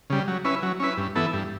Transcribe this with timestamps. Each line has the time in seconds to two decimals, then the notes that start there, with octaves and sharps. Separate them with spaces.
0.10 C#3 G3
0.28 F#3
0.45 C#4 E4 B4
0.63 F#3
0.80 C#4 E4 B4
0.97 G2
1.15 E3 B3 E4 A4
1.33 G2